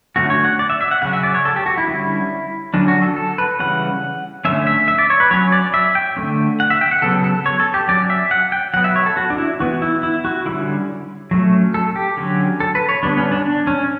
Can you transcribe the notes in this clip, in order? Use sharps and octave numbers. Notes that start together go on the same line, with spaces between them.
D3 A3 C#4 F#4
C#5
F#5
D5
E5
E5
F#5
C#3 F#3 C#4 F#5
E5
D5
C#5
A4
G4
F#4
E4
D3 G3 C#4
D3 F#3 C#4 D4
F#4
A4
A4
B4
C#3 E3 G3 C#4 F#5
D3 A3 C#4 E5
E5
E5
D5
C#5
B4
F#3 C#4 C#5
D5
E5
G5
D3 A3 C#4
F#5
E5
G5
F#5
C#3 F#3 B3 A4
A4
C#5
A4
G4
F#3 C#4 D5
E5
F#5
G5
F#3 B3 F#5
E5
C#5
A4
F#4
D4
E4
E3 B3 F#4
E4
E4
F#4
D3 G3 C#4 E4
F#3 A3 C#4
A4
G4
D3 F#3 C#4
A4
B4
C#5
D3 G3 B3 D4
C#4
D4
D4
C#4